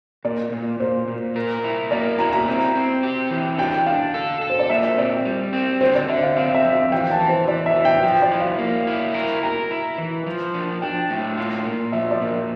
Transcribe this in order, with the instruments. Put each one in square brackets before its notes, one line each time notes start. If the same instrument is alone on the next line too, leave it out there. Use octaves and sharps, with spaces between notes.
[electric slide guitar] A#2 [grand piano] D5
[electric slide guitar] A#2
[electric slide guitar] A#2 [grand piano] C5
[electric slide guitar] A#2
A#4
E4
[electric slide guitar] A#3 [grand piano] D5
[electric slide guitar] E4 [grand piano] A#5
[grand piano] A#5
[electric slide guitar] C4
C4
G4
E3
[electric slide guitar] D4 [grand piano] G5
[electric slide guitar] D4 [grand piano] F5
[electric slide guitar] A4
A4
[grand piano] C5
D5
[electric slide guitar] A#2 [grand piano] E5
[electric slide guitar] C4 [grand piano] D5
[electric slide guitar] G3
C4
[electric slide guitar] D3 [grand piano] C5
[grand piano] D5
[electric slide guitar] D3 [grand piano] E5
[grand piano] F5
[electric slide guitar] C4 [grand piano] F5
[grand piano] E5
[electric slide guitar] F2
[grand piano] F5
[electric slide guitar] E3 [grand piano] G5
[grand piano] A5
[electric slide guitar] E3
[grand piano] C5
[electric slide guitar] E3 [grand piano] D5
[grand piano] E5
[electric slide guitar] E3
[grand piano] G5
[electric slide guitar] F3 [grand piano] G5
[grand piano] D5
[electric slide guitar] E4
[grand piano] F5
[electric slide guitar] A#3
E4
A#4
[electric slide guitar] A#4 [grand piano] A#5
[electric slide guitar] E4
E3
F3
D4
[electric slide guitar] D4 [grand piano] G5
[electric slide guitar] A2
F4
A#2
[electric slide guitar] F3 [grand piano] E5
[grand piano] D5
[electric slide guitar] A#2